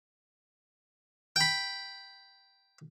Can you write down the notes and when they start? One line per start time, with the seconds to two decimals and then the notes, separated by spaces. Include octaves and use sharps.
1.36 G5 B5